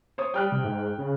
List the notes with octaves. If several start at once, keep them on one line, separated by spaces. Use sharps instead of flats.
C5 C#5 D#6
G3 G5 F6 F#6
C3
G#2
C#3